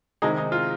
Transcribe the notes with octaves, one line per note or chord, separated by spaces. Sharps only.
C3 D#3 G#3 D#4 G#4
D#4
F4